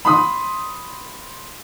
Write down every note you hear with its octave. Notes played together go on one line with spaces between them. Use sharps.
B5 C6 D#6